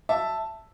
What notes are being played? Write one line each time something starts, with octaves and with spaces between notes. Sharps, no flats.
E5 A5